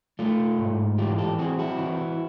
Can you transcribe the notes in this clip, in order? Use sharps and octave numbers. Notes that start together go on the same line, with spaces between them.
A3 F4
G#2
E3 F4 G4
G4 A4
C4 F#4 G#4
E4 F#4
E3